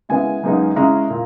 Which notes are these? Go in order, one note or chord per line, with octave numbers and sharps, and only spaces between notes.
C#3 G#3 B3 E4 G#5
F#2 C#3 G#3 B3 D#4
C#3 G#3 C#4 E4 A#5
A#2